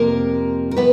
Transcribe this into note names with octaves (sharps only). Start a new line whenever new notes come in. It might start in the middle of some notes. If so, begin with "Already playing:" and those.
Already playing: F2 C3 F3 A#3 A#4
A#4
C3 B3 B4